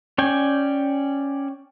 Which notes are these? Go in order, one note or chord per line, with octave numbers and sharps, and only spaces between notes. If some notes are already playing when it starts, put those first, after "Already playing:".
C#4 D5 G5 G#5